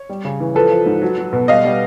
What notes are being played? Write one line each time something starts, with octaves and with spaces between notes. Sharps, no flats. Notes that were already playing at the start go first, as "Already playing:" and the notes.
Already playing: C#5
G3
C#3
E3
F3 A4 B4
F3
G#2
F#3
F#3
B2
G3 D#5 F5
G3